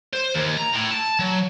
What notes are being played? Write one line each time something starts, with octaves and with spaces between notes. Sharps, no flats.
C5
D#2
A#5
A2
A5
F#3